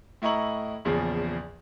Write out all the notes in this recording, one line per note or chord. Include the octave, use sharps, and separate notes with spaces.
A2 E4 D#5 A#5 C#6 F#7
A#1 E2 C#3 F3